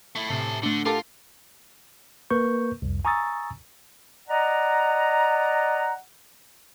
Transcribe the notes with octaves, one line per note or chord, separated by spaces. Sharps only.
A3 E4
A2 C3 G4 A4 C7
D3 A3 D4
F4 G4 A4 A#4 F#5 G#5
A#3 A#4 B4 C#6 G6
C2 F2
G#5 A#5 C#6 D#6 E6 A6
D5 D#5 F#5 A#5